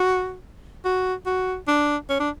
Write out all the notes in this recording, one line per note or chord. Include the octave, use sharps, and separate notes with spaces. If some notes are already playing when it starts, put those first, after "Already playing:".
Already playing: F#4
F#4
F#4
D4
C#4
D4